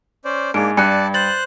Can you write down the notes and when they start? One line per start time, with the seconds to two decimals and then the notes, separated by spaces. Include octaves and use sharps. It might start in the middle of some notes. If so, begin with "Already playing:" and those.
0.25 C#4 C5 D5
0.54 G#2 A#3 D4 D#4 G#4 D7
0.77 G2 D5 A5 F#6 C#7
1.14 C5 F#6 A6 F#7